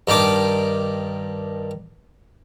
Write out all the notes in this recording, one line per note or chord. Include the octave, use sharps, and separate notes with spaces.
G2 D#3 D4 D6